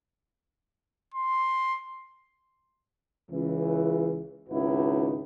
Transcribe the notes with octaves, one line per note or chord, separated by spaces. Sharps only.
C6
C#2 E3
G#1 C#2 D#4 E4 F#4 B4